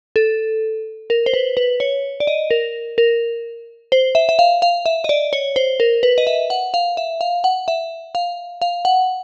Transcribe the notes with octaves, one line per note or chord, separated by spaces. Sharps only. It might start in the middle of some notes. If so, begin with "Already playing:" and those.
A4
A#4
C5
B4
B4
C#5
D5
D#5
A#4
A#4
C5
E5
E5
F5
F5
E5
D#5
D5
C#5
C5
A#4
B4
D#5
E5
F#5
F5
E5
F5
F#5
E5
F5
F5
F#5